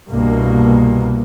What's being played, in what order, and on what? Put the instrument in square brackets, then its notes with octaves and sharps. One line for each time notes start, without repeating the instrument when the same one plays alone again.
[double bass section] C2 G2 B2 A#3